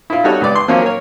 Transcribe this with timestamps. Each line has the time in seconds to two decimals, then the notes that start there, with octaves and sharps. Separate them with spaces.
0.10 E4 F4
0.24 G3 D#4 F#4 A4 C#5
0.41 C#2 B4 D5
0.55 C6
0.68 F3 F#3 A#3 C#4
0.82 A#4 C#5